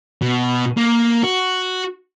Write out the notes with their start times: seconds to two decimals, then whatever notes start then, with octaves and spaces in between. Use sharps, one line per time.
0.22 B2
0.77 A#3
1.24 F#4